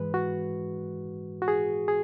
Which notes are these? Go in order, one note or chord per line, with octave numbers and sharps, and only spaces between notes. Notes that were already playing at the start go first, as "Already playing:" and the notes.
Already playing: G#2 E3 G#3 B4
F#4
F#4
G#4
G#4